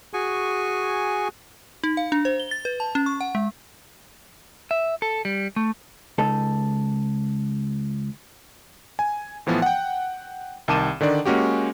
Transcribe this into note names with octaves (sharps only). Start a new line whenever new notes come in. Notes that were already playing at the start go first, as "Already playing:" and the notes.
F#4 G#4 G#5 C#6
D#4
F5
D4
C5
G7
A6
B4
A5
C#4
C#6
F#5
G#3
E5
A4
G3
A3
C#2 D#4 A4
G#5
A2 E3 F3 B3
F#5 G5
C2 D#3 A5 D6 D#7 E7
D3 D#3 D4 D5
G#3 A#3 C#4 F#4 G4